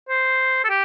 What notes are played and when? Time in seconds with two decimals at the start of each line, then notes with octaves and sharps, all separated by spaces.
0.09 C5
0.64 A4
0.69 G4